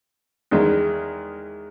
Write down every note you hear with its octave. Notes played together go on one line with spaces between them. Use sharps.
E2 D#3 G#3